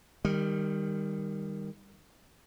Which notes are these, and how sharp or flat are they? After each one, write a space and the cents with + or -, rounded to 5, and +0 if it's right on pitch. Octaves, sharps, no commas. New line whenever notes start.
D#3 +0 G3 +20